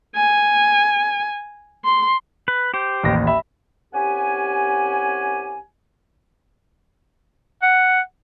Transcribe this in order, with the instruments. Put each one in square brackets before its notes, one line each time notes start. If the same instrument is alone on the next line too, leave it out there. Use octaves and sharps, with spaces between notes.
[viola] G#5
C6
[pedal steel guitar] B4
G4 C5
[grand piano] A1 D#2 A#6
E5 B5
[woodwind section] C2 C#4 G4 F#5 G#5
[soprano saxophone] F#5